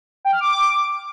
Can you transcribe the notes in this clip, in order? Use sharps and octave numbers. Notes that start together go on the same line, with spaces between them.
G5
F6
D6